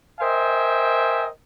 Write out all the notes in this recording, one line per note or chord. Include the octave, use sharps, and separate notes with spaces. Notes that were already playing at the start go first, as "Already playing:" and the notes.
A#4 C5 D#5 E5 G5 G#5